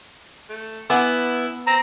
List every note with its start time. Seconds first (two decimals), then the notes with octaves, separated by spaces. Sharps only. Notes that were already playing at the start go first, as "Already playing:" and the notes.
0.50 A3
0.90 B3 E4 F#5 G#5 D6
1.67 C4 A#5